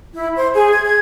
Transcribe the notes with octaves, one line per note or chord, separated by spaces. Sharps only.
E4
C5
G#4
G#6
G#6